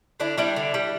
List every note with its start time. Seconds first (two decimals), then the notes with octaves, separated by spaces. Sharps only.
0.20 D3 D4 E4
0.38 G3 D4 E4
0.56 D3
0.74 G3